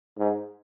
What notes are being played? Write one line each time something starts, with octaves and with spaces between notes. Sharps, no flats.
G#2